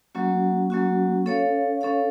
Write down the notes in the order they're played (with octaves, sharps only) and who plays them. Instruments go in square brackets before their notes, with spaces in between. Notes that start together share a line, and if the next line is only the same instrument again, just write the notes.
[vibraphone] F#3 A#3 C#4 F#4
F#3 A#3 C#4 F#4
C#4 A4 C#5 F5
C#4 A4 C#5 F5